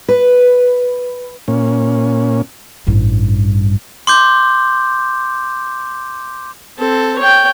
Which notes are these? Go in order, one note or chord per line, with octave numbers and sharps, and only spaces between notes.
B4
A#2 C#4
A1 G2
C6 D6 G6
C4 A4
C#5 G5